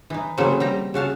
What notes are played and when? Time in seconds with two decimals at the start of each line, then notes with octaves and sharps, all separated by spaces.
0.10 E3 D#4
0.38 C#3 E3 F#3 A3 A#3 C4
0.60 G3 G5 A#5
0.94 C#3 F#4 F5 A5